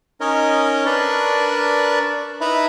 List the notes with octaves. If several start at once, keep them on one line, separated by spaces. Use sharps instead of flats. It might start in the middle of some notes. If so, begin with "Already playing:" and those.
C#4 D#4 A#4 C#5 D#5
D4 A#4 B4 D5 C#6
D#4 E4 B4 E5 A#5 B5